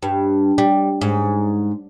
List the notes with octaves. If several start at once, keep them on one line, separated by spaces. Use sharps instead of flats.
G2
G3
G#2